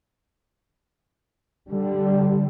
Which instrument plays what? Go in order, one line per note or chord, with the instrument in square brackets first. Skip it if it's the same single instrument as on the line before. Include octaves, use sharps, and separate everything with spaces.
[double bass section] D3 G3